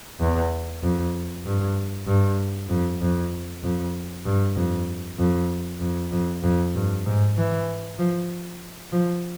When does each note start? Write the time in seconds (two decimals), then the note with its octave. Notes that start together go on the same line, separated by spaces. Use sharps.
0.20 E2
0.83 F2
1.45 G2
2.07 G2
2.70 F2
3.01 F2
3.63 F2
4.25 G2
4.56 F2
5.19 F2
5.81 F2
6.12 F2
6.43 F2
6.75 G2
7.06 G#2
7.37 E3
7.99 F3
8.93 F3